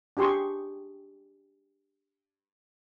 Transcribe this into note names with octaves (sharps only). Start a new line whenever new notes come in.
D4 G4 G#4 C6 C#6